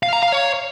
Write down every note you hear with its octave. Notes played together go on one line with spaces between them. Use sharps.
F5
A#5
F5
C#5